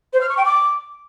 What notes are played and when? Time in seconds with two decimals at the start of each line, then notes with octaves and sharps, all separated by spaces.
0.13 C5
0.21 F6
0.29 C#6
0.37 G5
0.45 D6